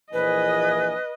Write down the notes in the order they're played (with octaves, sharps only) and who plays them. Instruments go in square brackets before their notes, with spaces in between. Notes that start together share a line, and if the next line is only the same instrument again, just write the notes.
[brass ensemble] A#1 E3 G#5 [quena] B4 [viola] D#5